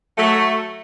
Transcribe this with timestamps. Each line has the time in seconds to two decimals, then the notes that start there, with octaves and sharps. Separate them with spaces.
0.17 F#3 A3